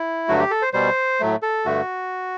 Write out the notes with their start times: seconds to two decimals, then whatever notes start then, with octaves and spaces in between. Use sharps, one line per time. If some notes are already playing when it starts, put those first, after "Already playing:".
Already playing: E4
0.28 G2 D3 F#3 A3 F#4
0.40 G4
0.51 A4
0.62 C5
0.73 B2 G3 C5
1.20 A2 F#3 A3
1.43 A4
1.65 G2 D3 A3 F#4